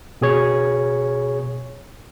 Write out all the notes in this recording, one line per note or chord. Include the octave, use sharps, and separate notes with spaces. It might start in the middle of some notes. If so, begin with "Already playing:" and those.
B2 G#4 C#5